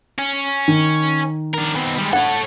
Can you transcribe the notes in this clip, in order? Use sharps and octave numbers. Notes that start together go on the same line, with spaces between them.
C#4
D#3
D4 A#4
B2 C4
G3 G#3
A4 C#5 F#5